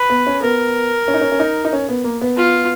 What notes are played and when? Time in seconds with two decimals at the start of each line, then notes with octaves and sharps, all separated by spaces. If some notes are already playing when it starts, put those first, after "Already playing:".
Already playing: B4
0.10 B3
0.27 C#4
0.42 B3 A#4
1.08 C#4
1.14 D#4
1.21 C#4
1.32 C#4
1.40 D#4
1.65 D#4
1.73 C#4
1.89 B3
2.04 A#3
2.22 B3
2.37 F4